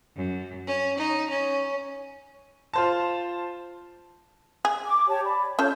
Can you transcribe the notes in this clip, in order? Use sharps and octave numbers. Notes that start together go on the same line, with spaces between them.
F#2
C#4
D#4
C#4
F4 C5 A5
G#4
D6
G4 C#5 A5
D5 B5
C#4 F4 A4 C#5 G6